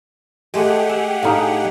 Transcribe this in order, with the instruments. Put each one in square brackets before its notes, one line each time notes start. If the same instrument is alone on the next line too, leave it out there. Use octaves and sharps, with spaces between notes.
[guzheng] G#3 A3 [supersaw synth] G4 G#4 F#5
[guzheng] E5
[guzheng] A2 D4 [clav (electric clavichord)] D#4 F5